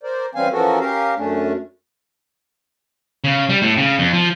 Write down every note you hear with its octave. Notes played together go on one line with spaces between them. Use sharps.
A#4 C5 D5
E3 G3 C4 C#4 F5 G#5
E3 F3 C#4 F#4 A4 A#4
C#4 G4 A#4 F5
F#2 A3 C#4 D4
C#3
G3
A2
C#3
F2
F3